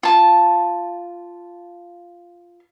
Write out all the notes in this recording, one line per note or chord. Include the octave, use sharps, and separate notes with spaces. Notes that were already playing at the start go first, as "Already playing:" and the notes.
F4 A5